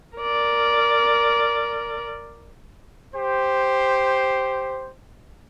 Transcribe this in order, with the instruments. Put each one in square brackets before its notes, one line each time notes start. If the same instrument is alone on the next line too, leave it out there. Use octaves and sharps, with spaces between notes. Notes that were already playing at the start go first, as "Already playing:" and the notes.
[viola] A#4 D5
[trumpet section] G4 C5